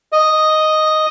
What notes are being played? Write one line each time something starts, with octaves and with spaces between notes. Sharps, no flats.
D#5